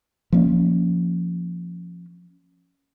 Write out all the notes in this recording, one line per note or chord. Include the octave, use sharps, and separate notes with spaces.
F3 A#3 C#4